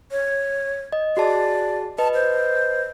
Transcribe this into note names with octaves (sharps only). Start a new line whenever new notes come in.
C#5
D#5
F#4 G#4 D5 A5
B4 D#5 A5
C5